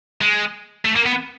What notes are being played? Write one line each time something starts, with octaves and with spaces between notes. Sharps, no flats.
G#3
A3
A#3
B3